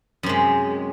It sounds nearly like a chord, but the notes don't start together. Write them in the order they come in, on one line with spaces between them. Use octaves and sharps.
F#2 C3 G#3